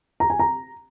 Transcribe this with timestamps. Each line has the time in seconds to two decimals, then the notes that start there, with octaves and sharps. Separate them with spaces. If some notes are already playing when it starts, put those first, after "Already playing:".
0.20 A#5
0.30 G#5
0.40 A#5